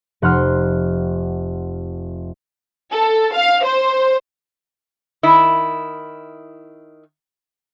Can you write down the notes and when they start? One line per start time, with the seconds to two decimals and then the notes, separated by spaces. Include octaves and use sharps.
0.22 F1 F#5 C6 F6
2.92 A4
3.34 F5
3.64 C5
5.23 D#3 E4